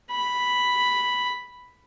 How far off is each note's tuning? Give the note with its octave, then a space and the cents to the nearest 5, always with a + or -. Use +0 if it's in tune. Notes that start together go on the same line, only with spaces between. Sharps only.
B5 +0